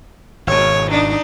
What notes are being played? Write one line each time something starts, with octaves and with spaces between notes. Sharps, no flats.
G#1 B2 C#5
D4 D#4